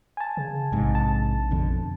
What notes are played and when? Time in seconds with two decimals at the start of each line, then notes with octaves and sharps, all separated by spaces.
0.17 G#5 A5
0.37 C#3
0.72 A#1 G#2 C3
0.95 A5
1.51 F2 B2 D3